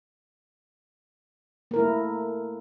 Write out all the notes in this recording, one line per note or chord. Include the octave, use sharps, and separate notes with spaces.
A3 A#3 E4 A#4